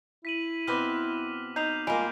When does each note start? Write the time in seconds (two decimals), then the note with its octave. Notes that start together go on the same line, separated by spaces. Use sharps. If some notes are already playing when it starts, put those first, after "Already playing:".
0.25 E4 B6 D#7 F#7
0.67 B2 C4 B4 D6 F6
1.56 D#4 G6 C7 F7
1.87 G3 G#3 A#3 F4 D6 D7 F7